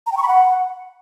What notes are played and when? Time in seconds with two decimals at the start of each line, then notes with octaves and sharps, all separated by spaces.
0.06 A#5
0.12 G5
0.17 C#6
0.23 B5
0.28 F#5